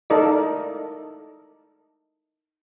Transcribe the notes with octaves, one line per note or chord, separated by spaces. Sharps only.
D#4 E4 A4 A#4 D5 D#5